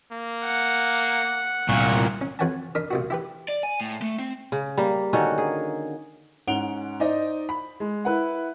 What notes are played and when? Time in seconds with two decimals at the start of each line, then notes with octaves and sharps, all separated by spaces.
0.12 A#3
0.46 F#5
1.69 C2 A#2 C#6
2.21 C#4
2.39 F2 B4 C#5 F#5 G#5 A5
2.75 D4 D#4 A#4 B5
2.91 B1 A#2 F#4
3.10 E4 G4 B4
3.48 D5
3.63 G#5
3.81 A2
4.02 A3
4.19 C4
4.52 C#3
4.77 G3 A#3
5.13 D3 D#3 C#4 F#4
5.38 G#4
6.47 G#2 C#4 F#5 D7 F7 G7
7.00 D#4 C5 D5 D#5
7.49 B5
7.80 G#3
8.05 E4 B4 F#5